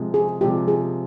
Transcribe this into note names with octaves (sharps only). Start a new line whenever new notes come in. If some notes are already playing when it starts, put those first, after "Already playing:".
Already playing: C3 F3 G#3
G#4
C3 F3 G#3 G4
G#4